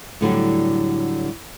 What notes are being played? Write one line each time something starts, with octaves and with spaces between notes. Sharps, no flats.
A2 D3 F#3 G3